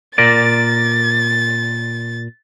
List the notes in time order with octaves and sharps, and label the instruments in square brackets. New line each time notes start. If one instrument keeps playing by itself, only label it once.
[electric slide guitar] A#2 A#4 D5 [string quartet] A6